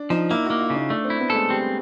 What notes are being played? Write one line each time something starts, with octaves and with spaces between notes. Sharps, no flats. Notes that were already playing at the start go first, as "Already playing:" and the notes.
Already playing: D4
F3 D#4
A#3 E4
F#4
A#3
F4
C#3
D#4
A3 D4
C4
E4
B3
G#3 A3 A4
G3 C4